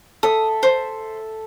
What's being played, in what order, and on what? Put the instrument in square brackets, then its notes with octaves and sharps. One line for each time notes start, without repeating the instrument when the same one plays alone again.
[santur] A4 E5 [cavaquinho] D#6
[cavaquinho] C5